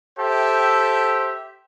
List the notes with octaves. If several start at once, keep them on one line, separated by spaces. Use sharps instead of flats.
G4 A4 C5 E5 G5